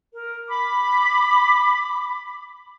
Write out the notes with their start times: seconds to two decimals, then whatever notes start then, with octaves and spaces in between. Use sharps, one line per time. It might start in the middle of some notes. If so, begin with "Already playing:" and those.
0.12 A#4
0.48 B5 D6